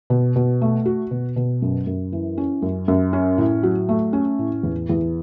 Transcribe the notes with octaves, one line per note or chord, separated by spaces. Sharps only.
B2
B2
A3
F#4
B2
B2
F#2
F#2
E3
C#4
F#2
F#2
C#4
A2
F#3
A3
C#4
A2
E2
E2